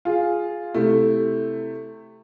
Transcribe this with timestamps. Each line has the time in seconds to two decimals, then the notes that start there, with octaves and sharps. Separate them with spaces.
0.05 F4 G#4
0.74 C3 A3 E4